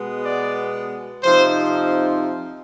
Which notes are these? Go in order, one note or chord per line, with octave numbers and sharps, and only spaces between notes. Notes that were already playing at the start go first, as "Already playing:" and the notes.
Already playing: B2 G#3 B3
D5
C3 F3 C4 D#4 C5